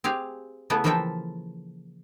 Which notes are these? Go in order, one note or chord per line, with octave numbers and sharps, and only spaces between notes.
C4 G4 G#4 F5
C#3 A3 B3 E4 G#4
E3 F3 A#3 A4 E5 G5